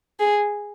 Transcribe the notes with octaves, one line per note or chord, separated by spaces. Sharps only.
G#4